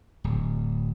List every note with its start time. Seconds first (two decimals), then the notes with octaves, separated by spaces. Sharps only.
0.24 D1